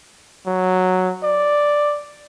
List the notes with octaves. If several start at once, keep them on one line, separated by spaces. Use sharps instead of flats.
F#3
D5